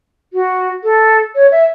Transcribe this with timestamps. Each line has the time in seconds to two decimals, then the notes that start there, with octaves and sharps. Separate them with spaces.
0.33 F#4
0.84 A4
1.35 C#5
1.52 E5